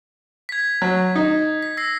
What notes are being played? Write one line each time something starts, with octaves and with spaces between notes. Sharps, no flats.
G#6 B6
F#3
D#4
B6
E6 A#6 C7